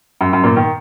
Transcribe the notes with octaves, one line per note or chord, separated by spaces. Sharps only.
F#2
F#2
A#2
D#3